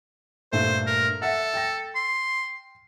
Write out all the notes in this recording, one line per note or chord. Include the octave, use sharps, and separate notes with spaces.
G2 A#2 A3 C5
A#4
A4 E5 F#5
G5 A#6
C6